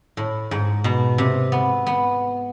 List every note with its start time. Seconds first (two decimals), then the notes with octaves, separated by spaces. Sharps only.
0.17 A2
0.51 G#2
0.84 B2
1.18 C3
1.52 B3
1.86 B3